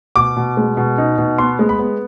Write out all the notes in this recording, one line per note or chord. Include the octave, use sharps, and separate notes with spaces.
B2 D6
B2
G#3
B2
D#4
B2
B3 C6
G#3
B5
B3